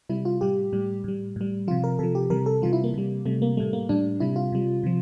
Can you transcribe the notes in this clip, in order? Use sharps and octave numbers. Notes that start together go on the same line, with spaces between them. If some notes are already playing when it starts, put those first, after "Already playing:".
C3 G3 E4
F4
A2 G3 G4
A2 G3
A2 G3
A2 G3
C3 F3 F4
A#4
C3 F3 A4
G4
C3 E3 G3 A#4
A4
C3 E3 G3 F4
E4
A#3
C3 G3
C3 G3 A3
A#3
A2 G3 A3
A#3
A2 G3 D4
C3 G3 E4
F4
C3 G3
C3 F3